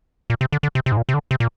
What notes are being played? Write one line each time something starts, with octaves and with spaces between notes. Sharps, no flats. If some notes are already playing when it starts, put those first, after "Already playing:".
A#2
C3
D3
D3
C3
C3
G#2
A#2
C3
D3
C3
A#2